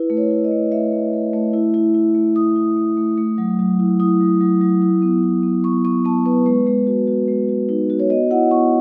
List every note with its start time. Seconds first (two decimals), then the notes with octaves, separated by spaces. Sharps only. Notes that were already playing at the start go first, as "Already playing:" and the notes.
Already playing: E4 B4
0.10 A3
0.17 C#5
0.31 E4
0.44 D#5
0.51 A3
0.72 A3 E5
0.92 A3
1.13 A3
1.33 A3
1.53 E4
1.74 E4
1.94 E4
2.15 A3
2.36 E4 D#6
2.56 E4
2.77 A3
2.97 A3
3.17 A3
3.38 F#3
3.59 F#3
3.79 E4
4.00 E4 D#6
4.21 F#3
4.41 F#3
4.61 F#3
4.82 E4
5.02 B3
5.23 E4
5.43 B3
5.64 B3 C#6
5.85 B3 C#6
6.05 B3 A5
6.26 B3 B4
6.46 G#3 B4
6.67 G#3
6.87 F#4
7.07 F#4
7.28 G#3
7.49 F#4
7.69 D#4
7.90 F#4
7.99 C#5
8.10 B3 D#5
8.31 E4 F#5
8.51 B3 C#6